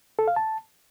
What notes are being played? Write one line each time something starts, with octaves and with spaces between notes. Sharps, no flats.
A4
F5
A5